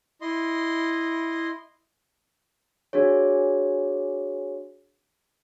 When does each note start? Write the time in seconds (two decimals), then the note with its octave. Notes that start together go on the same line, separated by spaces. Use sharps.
0.21 E4 D#5 C6
2.93 D4 F#4 G#4 C#5